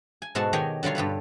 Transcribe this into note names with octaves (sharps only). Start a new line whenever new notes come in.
G#5
G#2 B2 G#3 F#4 A4 A5
D#3 G4 C#5 D#5 G5 G#5
D3 F#3 G3 F4 C#5
G2 G4 A4 B4